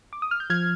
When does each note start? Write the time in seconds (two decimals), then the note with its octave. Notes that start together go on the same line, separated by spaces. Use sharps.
0.13 D6
0.22 D#6
0.31 F6
0.40 G6
0.50 F3 F6 G#6